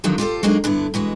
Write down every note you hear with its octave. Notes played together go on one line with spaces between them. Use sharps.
D3 D#3 F3 F#3 C4 G4
F4 G4 A4 C5
F#3 G#3 A#3 D4 D#4 F#4
G2 D3 B3 E4
B2 E3 G#3 F#4